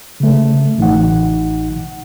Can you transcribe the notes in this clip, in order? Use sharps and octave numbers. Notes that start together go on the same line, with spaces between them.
C#3 A3
A1 D#4 F#5